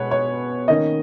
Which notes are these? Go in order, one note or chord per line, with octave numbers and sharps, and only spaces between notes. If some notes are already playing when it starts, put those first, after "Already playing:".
Already playing: B2 G#3 B3 B4 C#5
C#5
D#3 A#3 C#4 D#5